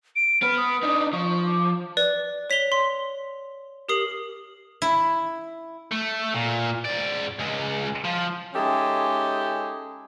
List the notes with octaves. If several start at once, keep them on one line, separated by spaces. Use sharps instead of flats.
D7
B3 B4 F6
D#6
D4 D#4
F3 C#6
D6
B4 D5
C#5 B6 F7 G7
C6
G4 A#4 D#6 C7 F#7
E4
A3
A#2
G#2 D5
C#2 G#3
F3
G#3 C#4 D#4 G4 A4 E5